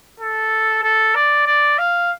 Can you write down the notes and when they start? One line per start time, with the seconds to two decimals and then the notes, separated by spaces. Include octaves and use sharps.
0.20 A4
0.84 A4
1.15 D5
1.47 D5
1.79 F5